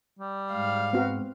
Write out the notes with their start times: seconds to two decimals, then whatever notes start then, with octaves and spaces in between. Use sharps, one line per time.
0.19 G3
0.52 G#2 F5
0.93 B3 C4 F#4